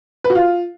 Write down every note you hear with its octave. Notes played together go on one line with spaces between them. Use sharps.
B4
F#4
F4